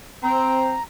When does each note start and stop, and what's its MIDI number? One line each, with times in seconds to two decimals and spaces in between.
0.23 0.74 60
0.23 0.83 82